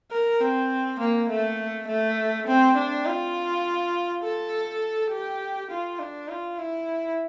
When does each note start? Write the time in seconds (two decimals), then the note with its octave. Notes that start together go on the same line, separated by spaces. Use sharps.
0.11 A#4
0.41 C4
0.99 A#3
1.29 A3
1.87 A3
2.47 C4
2.76 D4
3.06 F4
4.23 A4
5.11 G4
5.70 F4
5.99 D4
6.29 F4
6.58 E4